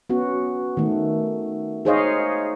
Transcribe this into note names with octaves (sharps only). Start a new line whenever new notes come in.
B3 C#4 F#4
D#3 A3
D#4 G#4 C5 C#5 D#5 F5